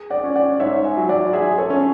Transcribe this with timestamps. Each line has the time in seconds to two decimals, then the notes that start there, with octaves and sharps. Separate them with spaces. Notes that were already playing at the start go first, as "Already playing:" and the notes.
Already playing: G#4
0.10 D5 F#5
0.23 C#4
0.36 D5 F#5
0.60 G#2 C#5 E5
0.84 E5 G#5
0.97 F#3
1.09 D5 F#5
1.33 G#4 E5 G#5
1.58 A4 C#5
1.70 C#4